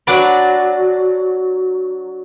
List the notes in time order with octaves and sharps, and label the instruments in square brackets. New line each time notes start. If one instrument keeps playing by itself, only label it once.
[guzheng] F#3 D4 F#4 D5 B5